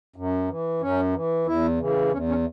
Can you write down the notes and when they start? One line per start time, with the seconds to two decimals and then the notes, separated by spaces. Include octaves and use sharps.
0.16 F#2
0.49 E3
0.81 F#2 C#4
1.14 E3
1.46 E2 E4
1.79 C#3 E3
2.13 E2 C#4
2.29 C#4